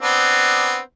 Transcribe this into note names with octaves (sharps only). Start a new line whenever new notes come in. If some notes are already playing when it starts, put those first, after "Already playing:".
B3 C4 D4